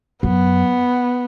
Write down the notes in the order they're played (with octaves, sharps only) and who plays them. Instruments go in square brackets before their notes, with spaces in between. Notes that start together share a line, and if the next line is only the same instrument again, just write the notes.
[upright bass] F#2 [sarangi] B3